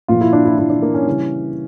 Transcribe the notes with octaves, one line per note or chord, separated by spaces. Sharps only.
A#2 F3 F4
E4
D4
E4
A#2 F3 E4
D4
A#3
C#4
C#3 E3 G3